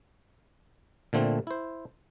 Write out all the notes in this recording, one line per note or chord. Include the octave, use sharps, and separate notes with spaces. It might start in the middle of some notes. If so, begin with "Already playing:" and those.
A#2 D3 A3 C4
E4 C5